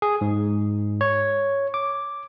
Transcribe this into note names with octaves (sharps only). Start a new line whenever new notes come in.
G#4
G#2
C#5
D6